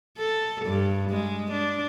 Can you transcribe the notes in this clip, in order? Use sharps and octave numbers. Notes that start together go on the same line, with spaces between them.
A4
G2
G#3
D4